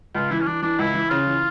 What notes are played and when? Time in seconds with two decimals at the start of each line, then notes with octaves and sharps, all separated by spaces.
0.15 C#2 F4
0.31 E3 E4
0.40 C#4
0.46 E3 D4
0.62 E3 D4
0.79 C#2 E4
0.94 E3
1.10 C#3 F4
1.27 E3